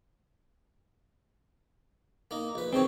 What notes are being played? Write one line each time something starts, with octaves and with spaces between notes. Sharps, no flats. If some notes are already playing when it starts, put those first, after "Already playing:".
A#3 D#4
A#1 B4
D#3 G#3 C4 C#5